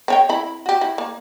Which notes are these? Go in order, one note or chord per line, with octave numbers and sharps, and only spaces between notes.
C4 C#5 G5
C4 E4 B5
F#4 G4
E4
A#3